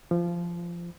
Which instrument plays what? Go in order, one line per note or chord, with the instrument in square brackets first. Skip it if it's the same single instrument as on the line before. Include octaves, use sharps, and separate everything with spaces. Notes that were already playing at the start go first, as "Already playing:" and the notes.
[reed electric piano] F3